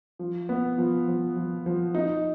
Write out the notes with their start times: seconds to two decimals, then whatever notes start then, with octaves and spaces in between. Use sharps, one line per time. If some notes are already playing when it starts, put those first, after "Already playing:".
0.19 F3
0.49 B3
0.78 F3
1.08 F3
1.36 F3
1.66 F3
1.95 D#4